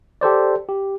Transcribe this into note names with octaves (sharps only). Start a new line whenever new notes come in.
G4 A4 C5 D5
G4